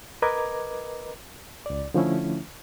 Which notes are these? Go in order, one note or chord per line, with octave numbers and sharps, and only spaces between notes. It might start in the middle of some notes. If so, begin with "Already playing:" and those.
A#4 B4 D#5 A#5 D6 G#6
C#2 D5
D3 F3 A3 C#4 E4